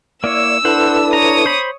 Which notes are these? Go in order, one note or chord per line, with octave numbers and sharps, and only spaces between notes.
A#3 E4 C#5 D5 E6
D4 E4 A4 B4 C5 F#5
C#5 A#5 D#6
C5 B5